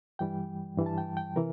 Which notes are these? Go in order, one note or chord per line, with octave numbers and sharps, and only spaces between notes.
G2 E3 G3 G5
G2 E3 G3
A5
G5
G5
C3 E3 A#4